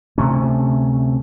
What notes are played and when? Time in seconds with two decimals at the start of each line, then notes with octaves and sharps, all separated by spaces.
0.18 D2 C3 A3 C#4